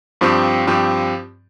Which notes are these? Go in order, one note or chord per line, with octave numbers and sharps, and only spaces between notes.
G2 F3 C4 G4
G2 F3 C4 G4